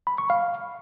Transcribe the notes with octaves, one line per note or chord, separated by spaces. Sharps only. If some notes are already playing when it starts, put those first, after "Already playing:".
B5
C#6
F5